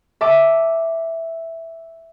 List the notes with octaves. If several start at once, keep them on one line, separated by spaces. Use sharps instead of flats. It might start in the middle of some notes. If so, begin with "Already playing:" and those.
E5 A5 D6